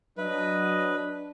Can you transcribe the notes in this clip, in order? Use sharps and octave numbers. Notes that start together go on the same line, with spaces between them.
F#3 D4 B4 D#5